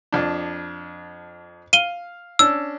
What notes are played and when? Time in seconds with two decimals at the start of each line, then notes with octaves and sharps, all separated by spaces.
0.12 F2 D4
1.73 F5 D#7 G7
2.39 C#4 D4 E6